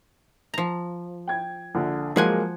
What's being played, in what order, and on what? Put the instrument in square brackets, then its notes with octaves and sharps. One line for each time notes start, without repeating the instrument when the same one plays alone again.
[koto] F3 A#5
[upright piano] G5 G#6
A#1 D3
[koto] F3 F#5 G#5 [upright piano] F#3 G#3 A#3